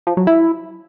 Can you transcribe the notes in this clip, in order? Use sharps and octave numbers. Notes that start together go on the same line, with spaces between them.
F3
F#3
E4